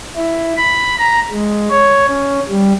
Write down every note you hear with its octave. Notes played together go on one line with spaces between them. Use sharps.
E4
B5
A#5
G#3
C#5
C#4
G3